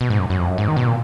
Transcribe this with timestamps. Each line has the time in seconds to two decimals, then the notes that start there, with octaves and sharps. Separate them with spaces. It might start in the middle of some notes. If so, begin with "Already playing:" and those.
0.01 B2
0.10 G#2
0.19 F#2
0.30 F#2
0.39 F2
0.49 F#2
0.58 G#2
0.68 D#3
0.76 B2
0.87 A#2